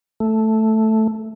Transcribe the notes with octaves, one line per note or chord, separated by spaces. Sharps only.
A3